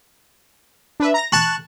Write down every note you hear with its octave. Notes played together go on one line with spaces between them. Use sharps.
D4 B4 E5
A#5 A#6
A5 C#6 F#6